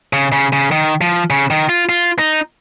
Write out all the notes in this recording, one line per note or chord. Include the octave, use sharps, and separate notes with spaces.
C#3
C#3
C#3
D#3
F3
C#3
D#3
F4
F4
D#4